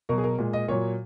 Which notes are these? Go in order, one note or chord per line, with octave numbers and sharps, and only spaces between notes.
B2 F#3 A#4
G#4
A#4
A#2 G#3
D#5
A#2 F#3 C#5